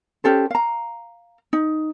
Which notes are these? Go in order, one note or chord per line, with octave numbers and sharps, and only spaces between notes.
C#4 G4 A4 C5
F5 A#5
D#4